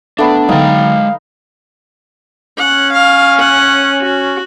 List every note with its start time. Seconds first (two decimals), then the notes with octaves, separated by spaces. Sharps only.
0.18 A3 B3 D4
0.49 D3 F#3 G#3 D#4 F5 G5 A#5
2.58 C#4 F#5
2.93 F5
3.39 F#5
4.01 F#4